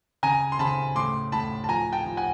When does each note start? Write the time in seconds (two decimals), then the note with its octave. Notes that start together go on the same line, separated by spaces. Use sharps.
0.23 C#3 G#5 A#5
0.52 C6
0.59 C#3 A5 B5
0.95 A2 C6 D6
1.32 A2 A5 B5
1.64 A5
1.69 F3 G#5 A#5
1.92 G5 A5
2.05 F3
2.17 F#5 G#5